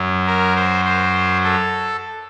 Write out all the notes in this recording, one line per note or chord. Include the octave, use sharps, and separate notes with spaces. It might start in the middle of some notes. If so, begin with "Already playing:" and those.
Already playing: F#2 F#3
A#4
C5
C5
A4